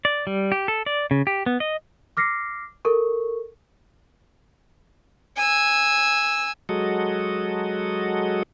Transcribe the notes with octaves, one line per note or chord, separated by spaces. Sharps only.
D5
G3
G4
A4
D5
C#3
G4
B3
D#5
D6 F6 A#6 C7 C#7
A4 A#4 C#6
G#5 E6
F#3 G#3 F#4 A4 D#5